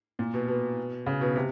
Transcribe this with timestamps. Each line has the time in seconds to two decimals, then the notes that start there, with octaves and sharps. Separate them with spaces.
0.19 A#2
0.34 B2
0.48 B2
1.06 C#3
1.21 B2
1.36 C3